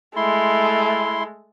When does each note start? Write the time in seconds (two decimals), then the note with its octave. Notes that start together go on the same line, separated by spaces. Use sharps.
0.16 G#3 A3 E4 C6